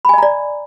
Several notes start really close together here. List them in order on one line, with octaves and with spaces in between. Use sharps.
B5 G#5 D#5 A#5 D5